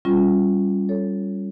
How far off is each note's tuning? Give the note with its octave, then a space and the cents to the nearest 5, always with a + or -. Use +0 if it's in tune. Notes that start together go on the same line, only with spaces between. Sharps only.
G3 +0 C#4 +0 F4 +10
A4 +0 C#5 +0